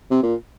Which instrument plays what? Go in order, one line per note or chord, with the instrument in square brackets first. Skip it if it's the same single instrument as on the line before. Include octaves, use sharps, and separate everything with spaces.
[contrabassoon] C3
A#2